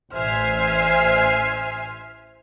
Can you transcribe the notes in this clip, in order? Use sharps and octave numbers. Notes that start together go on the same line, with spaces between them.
A1 C5 E5 G#5 F6 C7